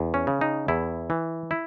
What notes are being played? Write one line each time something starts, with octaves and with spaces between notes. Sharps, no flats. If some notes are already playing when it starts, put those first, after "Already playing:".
Already playing: E2
C#4
C#3
D#4
E2 E4
E3
E4